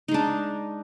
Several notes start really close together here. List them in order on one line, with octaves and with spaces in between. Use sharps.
D#4 G#3 D4